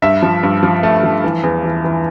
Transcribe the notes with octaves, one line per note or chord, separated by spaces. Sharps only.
G2 E5
F3
G2
F3
A3
F3
E3
E2
E3
E3